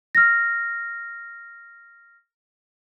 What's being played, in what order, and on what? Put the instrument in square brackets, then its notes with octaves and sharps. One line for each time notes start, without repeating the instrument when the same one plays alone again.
[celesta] F6 A#6